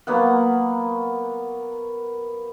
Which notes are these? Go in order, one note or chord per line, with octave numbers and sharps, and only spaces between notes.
F#3 A#3 B3 F#5